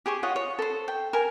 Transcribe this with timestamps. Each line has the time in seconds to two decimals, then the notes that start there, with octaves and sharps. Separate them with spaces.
0.06 G4 G#4 C5 C#6
0.23 F4 C#5 D#5 F#5
0.36 C#5
0.59 A4 C5
0.88 G5
1.13 A#4 G#5